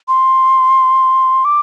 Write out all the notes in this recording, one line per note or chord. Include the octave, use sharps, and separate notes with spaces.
C6
D6